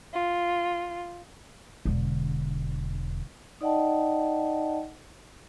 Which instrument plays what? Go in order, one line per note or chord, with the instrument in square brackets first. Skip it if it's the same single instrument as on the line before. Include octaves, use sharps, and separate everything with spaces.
[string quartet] F4
[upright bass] E1 D3
[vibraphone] D#4 D5 D#5 F#5 G5 A5